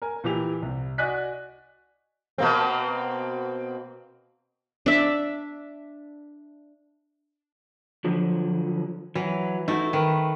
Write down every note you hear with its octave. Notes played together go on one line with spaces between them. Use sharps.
A#4 G#5
A#2 E3 E4 G4 G#5 F7
C2
F#4 D5 D#5 G#5 F#6 B6
B2 A#3 C4
D4 E5
D3 F3 F#3
E3 F#3
A3 D#4 E4 F#4
D#3 B4